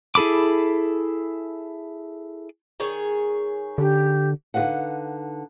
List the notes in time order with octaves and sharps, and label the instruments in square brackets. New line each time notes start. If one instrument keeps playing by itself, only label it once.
[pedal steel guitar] E4 G#4 A4 B5 D6
[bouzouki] D#3 G#4 C#5
[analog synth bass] D3 [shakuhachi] G4
[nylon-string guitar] D3 D#4 F#4 B4 F5 F#5